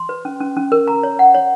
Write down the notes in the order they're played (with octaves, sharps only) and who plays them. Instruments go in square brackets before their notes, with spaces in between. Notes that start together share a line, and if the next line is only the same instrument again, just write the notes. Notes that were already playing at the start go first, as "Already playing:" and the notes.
Already playing: [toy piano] C6
B4
C#4
C#4
C#4
A#4
A#5
C#5
F#5
C#5